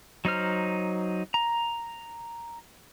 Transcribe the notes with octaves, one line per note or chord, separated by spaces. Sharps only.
F#3 D#4 C5 F6
A#5